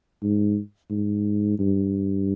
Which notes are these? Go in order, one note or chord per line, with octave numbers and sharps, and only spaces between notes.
G#2
G#2
G2